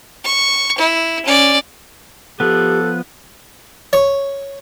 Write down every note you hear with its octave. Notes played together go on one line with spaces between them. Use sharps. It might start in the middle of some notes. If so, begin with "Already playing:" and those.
C#6
E4
C#4 D5
F3 B3 G4 A4 F#6
C#5